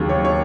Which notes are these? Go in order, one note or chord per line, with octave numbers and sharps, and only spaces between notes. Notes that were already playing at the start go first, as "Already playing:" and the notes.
Already playing: D#2 C#3 F#3
C#5
C#5